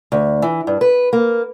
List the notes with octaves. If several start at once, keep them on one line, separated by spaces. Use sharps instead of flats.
D2
E3
G2
B4
A#3